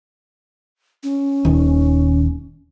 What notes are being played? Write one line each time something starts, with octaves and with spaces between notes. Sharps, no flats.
C#4
D#1 D#3